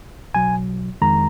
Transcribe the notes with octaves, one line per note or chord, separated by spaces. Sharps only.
B1 B2 F#3 G#5
F2 D#3 G#3 A#5